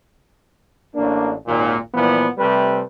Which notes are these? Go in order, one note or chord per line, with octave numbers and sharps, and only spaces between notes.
A1 A#3 D4
G#1 D#2 A#2
A#2 E3 F3 G3 B3
C3 G3 A3 C4 B4